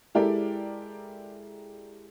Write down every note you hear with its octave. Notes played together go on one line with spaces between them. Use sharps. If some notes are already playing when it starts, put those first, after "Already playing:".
G#3 E4 G4 A4 A#4 D5